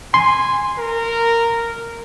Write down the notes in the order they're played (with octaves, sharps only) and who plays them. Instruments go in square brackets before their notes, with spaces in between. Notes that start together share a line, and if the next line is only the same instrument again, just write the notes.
[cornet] G#5 [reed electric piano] C6
[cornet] A#4